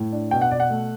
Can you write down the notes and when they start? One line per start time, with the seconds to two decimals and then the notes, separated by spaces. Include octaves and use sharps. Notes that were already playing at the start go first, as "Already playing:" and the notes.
Already playing: A2
0.12 D4
0.31 B2 G5
0.41 F#5
0.51 B2 D5
0.60 F#5
0.70 A3